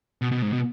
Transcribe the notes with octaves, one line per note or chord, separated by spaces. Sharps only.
B2
B2
G#2
B2